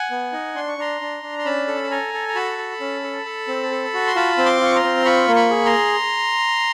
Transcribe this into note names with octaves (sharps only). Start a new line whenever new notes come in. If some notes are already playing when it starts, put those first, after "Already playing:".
Already playing: F#5 G#5
B3
D#4
D4 C6
C#6
D4 A#5 C6
D4
D4
C6
C#4 A5 B5
A4
A5
A4 G#5 A#5
A4
A#5
F#4 A5 B5
A4
C#4
A4
A4
C4
A4
F#4
C6
F4 A5 B5
C4
C6 D6
F4 C#6
A#5 C6
C4
F4 B5 C#6
A#3
B5 C#6
G#4
A#5 C6